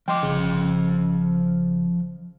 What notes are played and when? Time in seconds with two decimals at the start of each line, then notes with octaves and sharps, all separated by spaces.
0.08 F3 D#5 G5 C6 D6
0.23 G1 C#3